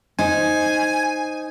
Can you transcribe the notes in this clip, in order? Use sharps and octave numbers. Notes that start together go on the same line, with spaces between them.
D#4 C5 G#5